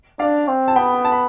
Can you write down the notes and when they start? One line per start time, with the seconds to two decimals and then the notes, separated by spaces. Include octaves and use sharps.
0.19 D4 D5 F5
0.48 C4
0.68 A5
0.76 B3 G5 B5
1.05 A5
1.12 B5